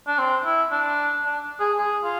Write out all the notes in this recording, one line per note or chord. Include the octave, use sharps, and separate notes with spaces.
D4
C4
E4
D4
D4
G#4
G#4
F4